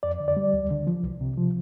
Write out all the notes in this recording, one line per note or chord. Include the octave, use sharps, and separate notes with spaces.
F2 D5
D3
D5
G3
D2
D3
F3
C2
C3
F3